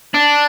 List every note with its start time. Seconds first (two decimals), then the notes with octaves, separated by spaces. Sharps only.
0.14 D4